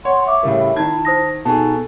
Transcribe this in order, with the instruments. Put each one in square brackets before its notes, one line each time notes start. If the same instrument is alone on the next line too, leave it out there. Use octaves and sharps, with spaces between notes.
[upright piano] C#5 [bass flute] F#5 [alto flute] C6
[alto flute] E5 [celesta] C#6 D6
[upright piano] A2 C#3 G3 [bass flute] E4 [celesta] A#4
[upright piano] D#3 G#6 [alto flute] A5
[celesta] C5 D#6 A#6
[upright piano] B2 G#4 [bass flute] D#4 [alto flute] A4 [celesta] A5